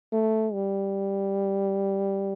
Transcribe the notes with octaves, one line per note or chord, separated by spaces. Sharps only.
A3
G3